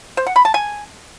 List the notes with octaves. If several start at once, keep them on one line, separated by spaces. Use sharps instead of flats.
C5
F#5
B5
A5
G#5